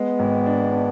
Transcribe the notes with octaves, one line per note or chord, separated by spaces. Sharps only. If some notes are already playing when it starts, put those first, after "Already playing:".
Already playing: G#3 B3
G#1
D4
D4